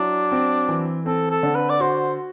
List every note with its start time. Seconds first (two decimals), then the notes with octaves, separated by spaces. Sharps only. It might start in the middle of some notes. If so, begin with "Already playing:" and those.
Already playing: F#3 D4 E4
0.32 C4
0.69 E3
1.06 C4 A4
1.30 A4
1.43 D3
1.55 B4
1.70 D5
1.80 F#4 C5